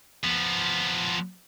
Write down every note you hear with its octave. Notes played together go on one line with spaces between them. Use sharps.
F3 B3